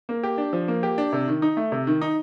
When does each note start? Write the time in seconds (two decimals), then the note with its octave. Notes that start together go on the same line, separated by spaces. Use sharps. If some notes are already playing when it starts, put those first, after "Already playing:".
0.09 A#3
0.23 G4
0.38 D4
0.53 F3
0.68 A#3
0.83 G4
0.98 D4
1.13 C3
1.28 D#3
1.42 D#4
1.57 A3
1.72 C3
1.87 D#3
2.01 D#4